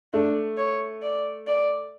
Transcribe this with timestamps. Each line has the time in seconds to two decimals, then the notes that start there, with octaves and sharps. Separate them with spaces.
0.14 A3 D4
0.58 C#5
1.03 D5
1.47 D5